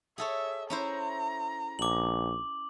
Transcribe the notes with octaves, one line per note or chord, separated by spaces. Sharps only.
G#4 A4 C#5 E5
C#4 E4 C5 A#5
A#1 D6 F#7